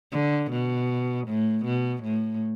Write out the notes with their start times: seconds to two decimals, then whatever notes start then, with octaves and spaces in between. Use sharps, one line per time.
0.12 D3
0.51 B2
1.28 A2
1.65 B2
2.04 A2